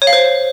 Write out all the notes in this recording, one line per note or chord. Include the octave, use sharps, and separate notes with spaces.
C#5
F5
C5